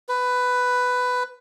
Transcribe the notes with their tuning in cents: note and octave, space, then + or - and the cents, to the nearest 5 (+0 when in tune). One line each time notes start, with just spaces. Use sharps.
B4 +10